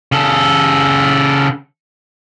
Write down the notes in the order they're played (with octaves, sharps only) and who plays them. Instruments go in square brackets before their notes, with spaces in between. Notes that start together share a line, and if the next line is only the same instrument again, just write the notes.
[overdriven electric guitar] C#3 A4